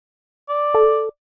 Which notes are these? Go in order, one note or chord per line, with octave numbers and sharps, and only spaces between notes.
D5
A4